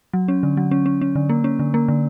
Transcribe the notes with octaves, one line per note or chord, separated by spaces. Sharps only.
F#3
C#4
D3
F#3
C#4
C#4
C#4
D3
A#3
C#4
D3
A#3
D3